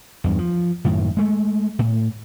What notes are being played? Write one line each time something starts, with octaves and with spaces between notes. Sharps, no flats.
E2 G2
F3
F#2 A2 D#3
G#3 A3
A2